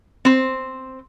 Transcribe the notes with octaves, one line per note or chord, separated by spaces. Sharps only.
C4 C5